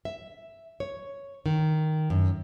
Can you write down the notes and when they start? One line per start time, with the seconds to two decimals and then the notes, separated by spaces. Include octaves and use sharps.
0.05 E5
0.80 C#5
1.46 D#3
2.10 F#2